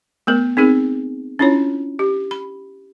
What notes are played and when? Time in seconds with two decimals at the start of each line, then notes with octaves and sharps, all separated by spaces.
0.27 A3 B3 A#4
0.57 C4 D#4 G#4 A#4
1.39 C#4 D4 E4 F4 C#5
1.99 G4
2.31 B5